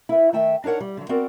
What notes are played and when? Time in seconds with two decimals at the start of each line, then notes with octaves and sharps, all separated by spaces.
0.09 E4 B4
0.33 D#3 A3 E5 G5
0.64 D4 D#4 A#4 C#5 F#5
0.80 G3
0.97 D3 F#3
1.09 B3 C4 F#4 A#4 D5 F#5